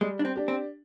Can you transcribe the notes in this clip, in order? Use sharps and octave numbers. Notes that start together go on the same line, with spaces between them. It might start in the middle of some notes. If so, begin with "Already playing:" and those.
G3 G#3
D4
C4
D4 G4
C4